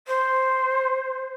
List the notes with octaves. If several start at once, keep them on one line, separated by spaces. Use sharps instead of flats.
C5